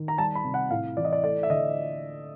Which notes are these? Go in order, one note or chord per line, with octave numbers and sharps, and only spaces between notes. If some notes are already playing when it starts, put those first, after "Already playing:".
Already playing: D#3
A#5
G3 A5
B5
C3
F#5
A2 F5
E3 D5
D#5
D5
A3 D5
E5
D3 D#5